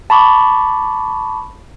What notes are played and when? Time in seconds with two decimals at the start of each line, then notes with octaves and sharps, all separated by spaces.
0.10 A5 B5 C#6 D6